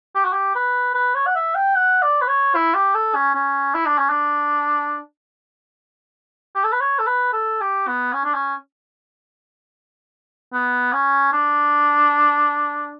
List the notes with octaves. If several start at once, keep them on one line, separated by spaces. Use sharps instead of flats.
G4
F#4
G4
B4
B4
C#5
F#5
E5
G5
F#5
D5
B4
C#5
E4
G4
A4
C#4
C#4
E4
D4
C#4
D4
G4
A4
B4
C#5
A4
B4
A4
G4
B3
C#4
D4
C#4
B3
C#4
D4